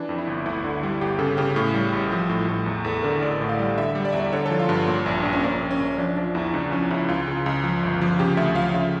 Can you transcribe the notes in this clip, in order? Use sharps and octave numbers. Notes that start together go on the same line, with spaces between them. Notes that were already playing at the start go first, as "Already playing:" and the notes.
Already playing: E3 D4
F2
E4
G1
D2 E4
D3
G3
G1 G4
C#3 A4
C#3 G4
A2
G3
A1
F3
A2
A2
E2
E2 A4
D3 A#4
A1 D5
A2
F5
G3
D3 E5
G3
D5
E2 E5
D5
D3 C#5
F3 A4
F4
G2
A#2
A#1
A#1 D4
C#4
A#1 A#3
A#1
C#4
A#1
F3 D4
F3 D4
E2 E4
C#2 D4
F3 C#4
C#2 E4
C#2 F4
C#3
C#2
F3
G1
F3
C#3 G4
D2 E5
F3 F5
C#3 E5